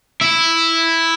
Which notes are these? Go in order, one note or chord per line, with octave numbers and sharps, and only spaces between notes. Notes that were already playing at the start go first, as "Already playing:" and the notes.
E4